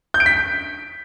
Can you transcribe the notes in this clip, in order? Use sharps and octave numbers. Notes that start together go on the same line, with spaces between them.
G6
D7
B6